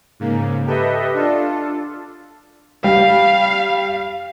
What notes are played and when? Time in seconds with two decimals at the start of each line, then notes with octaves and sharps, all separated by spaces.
0.20 G#2 C#3 A#3
0.66 G4 A4 B4 D#5 E5
1.14 D4 F4 A4
2.84 G3 F5